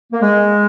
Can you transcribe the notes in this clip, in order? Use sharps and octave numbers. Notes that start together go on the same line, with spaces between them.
A#3
G#3